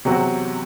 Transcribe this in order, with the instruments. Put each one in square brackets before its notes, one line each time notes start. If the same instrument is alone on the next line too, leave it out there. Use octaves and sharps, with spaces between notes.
[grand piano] E2 C3 F#3 C4 F#4